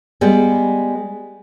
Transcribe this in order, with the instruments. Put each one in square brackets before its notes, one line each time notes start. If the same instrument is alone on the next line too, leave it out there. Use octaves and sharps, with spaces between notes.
[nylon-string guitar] G3 G#3 B3